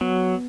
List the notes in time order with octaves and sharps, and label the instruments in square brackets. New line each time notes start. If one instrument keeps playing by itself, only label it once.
[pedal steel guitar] F#3 [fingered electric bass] B3